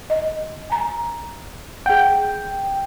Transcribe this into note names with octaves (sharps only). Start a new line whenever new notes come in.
D#5
G#5 A#5
G#4 F#5 G5